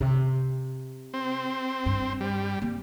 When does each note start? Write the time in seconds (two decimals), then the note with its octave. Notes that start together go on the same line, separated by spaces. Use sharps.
0.01 C3
1.14 C4
1.86 G2
2.21 G3
2.62 A#3 C4